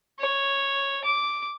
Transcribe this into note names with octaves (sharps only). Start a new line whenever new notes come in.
C#5
D6